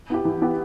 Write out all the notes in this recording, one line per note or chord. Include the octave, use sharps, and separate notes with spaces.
B3 E4 G4
E3
B3 E4 G4